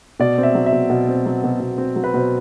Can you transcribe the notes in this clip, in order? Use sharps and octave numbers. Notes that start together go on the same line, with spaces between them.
B2 D5
C4
E5
F#3
E5
B2
B2
C4
F#3
B2
B2
C4
F#3
B4
B2 C5